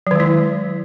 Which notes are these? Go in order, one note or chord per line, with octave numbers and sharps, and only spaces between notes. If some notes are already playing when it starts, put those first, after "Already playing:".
D#3 F#3 G#3 E4